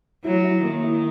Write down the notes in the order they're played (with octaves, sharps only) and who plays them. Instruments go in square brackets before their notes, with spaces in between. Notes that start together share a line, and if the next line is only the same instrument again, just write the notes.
[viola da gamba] F#3 [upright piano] E4
[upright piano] E4
[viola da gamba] D#3 [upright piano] A#3
[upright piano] E4